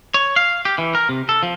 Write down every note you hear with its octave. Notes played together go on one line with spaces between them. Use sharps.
C#5
F5
G4
E3
A#4
C3
A4
F3